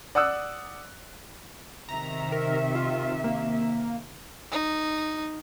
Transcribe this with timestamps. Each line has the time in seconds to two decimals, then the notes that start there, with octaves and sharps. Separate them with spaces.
0.15 D5 F#5 D#6 E6 F#6
1.89 C3 D#3 E5 A#5
2.32 A#4
2.75 F4
3.24 A#3
4.51 D#4